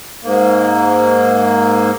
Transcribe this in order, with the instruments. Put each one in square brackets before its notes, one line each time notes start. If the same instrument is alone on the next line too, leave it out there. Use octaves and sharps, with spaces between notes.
[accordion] G#2 A#3